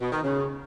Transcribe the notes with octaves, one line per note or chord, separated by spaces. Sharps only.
B2
D#3
C#3